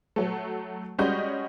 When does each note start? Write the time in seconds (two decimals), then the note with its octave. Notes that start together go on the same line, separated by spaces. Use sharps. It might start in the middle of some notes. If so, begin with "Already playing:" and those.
0.16 F#3 A3
0.98 G3 G#3 C#4 F#4 D#5 G6